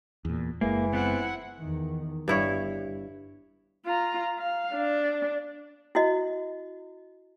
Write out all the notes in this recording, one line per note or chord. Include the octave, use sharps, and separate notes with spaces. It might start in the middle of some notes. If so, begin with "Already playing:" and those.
E2 A#2
F#1 E3 G#3 A#3
B3 C4 E4 F#5
E2 D#3
G1 G2 E4 C#5
F4 A#5
F5
D4
E4 F#4 D#5